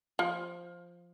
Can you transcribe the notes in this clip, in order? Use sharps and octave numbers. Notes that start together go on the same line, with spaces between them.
F3